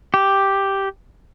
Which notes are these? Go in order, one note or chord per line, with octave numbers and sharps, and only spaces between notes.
G4